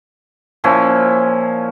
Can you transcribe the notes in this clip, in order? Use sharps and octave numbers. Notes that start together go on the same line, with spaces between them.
A#2 F3 C#4 E4